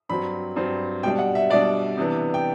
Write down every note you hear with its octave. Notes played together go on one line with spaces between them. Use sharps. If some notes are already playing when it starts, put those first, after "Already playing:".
G2 F#3 C4 B5
G2 F#3 C4
B2 G3 D4 G5
F#5
E5
B2 G3 D4 D5
C3 E3 B3 D4
G5